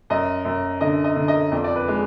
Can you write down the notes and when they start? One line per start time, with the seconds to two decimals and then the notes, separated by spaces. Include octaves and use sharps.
0.10 F#2 D#5
0.45 F#2
0.81 D3 D#5
1.04 D#5
1.16 D3
1.28 D#5
1.52 F2 D5
1.64 D5
1.76 B4
1.88 G#3